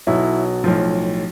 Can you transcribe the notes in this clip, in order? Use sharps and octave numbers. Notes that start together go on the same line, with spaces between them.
B1 B2 F#3 E4
B1 A2 F3